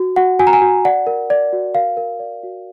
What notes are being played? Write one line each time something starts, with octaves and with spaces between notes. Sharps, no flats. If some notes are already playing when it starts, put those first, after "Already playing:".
Already playing: F#4
F#4 F#5
F#4 G#5
A#5
G#5
F#4
D5 F#5
A#4
D5
F#4
A#4 F5
A#4
D5
F#4